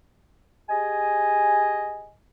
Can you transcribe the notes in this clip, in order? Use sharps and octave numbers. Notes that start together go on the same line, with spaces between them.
G4 G#4 D#5 G#5